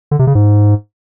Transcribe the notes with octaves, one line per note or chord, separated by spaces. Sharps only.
D3
C3
C#3
G#2